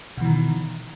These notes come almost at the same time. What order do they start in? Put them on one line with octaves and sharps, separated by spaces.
B2 E3 D#3